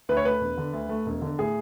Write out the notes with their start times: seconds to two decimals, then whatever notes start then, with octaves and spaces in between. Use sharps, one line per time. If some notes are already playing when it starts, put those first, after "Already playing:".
0.09 D2 B4
0.17 C#5
0.25 A3 B4
0.41 E1
0.57 D3
0.73 D2
0.89 A3
1.06 E1
1.22 D3
1.38 A2 G#4